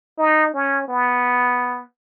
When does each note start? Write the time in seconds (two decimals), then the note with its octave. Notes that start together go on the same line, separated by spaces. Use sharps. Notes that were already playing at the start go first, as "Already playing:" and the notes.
0.18 D#4
0.54 C#4
0.88 B3